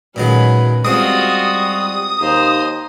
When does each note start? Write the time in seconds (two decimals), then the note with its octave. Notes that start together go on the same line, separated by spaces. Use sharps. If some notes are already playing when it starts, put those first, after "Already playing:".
0.16 A#2 D#3 F#3 G#3 C#4 B4
0.85 G3 G#3 C4 F4 F#4 D#6
2.20 D#2 C5 A#5